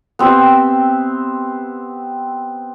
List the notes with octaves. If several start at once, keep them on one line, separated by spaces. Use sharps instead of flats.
B3 C4 G4 E5